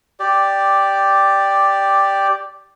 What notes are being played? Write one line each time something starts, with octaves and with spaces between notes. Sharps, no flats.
G4 D5